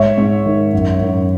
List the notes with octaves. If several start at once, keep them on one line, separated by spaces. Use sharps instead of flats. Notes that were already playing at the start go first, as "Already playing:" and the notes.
Already playing: G#2 C#5 E5
G#2
D#3
F#2
F#2